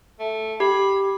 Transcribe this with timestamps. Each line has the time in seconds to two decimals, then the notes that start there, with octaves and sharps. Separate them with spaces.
0.20 A3
0.60 G4 B5